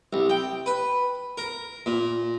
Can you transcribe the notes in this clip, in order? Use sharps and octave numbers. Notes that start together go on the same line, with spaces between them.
C2
G5
B4
A#4
A#2